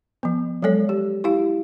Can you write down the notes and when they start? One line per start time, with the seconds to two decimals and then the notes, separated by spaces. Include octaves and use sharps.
0.23 F3 B3
0.62 F#3 G#3 A4 C#5
0.89 G4
1.24 E4 G4 F5